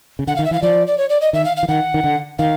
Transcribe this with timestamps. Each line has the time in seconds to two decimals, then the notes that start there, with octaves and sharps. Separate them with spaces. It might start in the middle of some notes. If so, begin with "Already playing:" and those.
0.19 C#3
0.27 D3 F#5
0.36 D#3 F5
0.45 E5
0.51 E3 F5
0.62 F3 D5
0.87 D5
0.98 C#5
1.10 D5
1.21 D#5
1.33 D#3 E5
1.45 F5
1.57 F5
1.63 E3
1.68 D#3 F#5
1.94 D#3
2.04 D3
2.39 D#3 F5